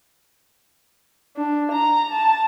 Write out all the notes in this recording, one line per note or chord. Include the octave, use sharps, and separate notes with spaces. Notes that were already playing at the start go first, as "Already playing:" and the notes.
D4
A#5
A5